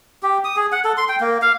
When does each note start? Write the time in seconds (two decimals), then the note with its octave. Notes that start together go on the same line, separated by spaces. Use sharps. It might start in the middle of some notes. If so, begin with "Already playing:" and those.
0.23 G4
0.44 D#6
0.56 G#4
0.72 F#5
0.85 A4
0.97 C6
1.09 G5
1.20 A#3
1.42 F5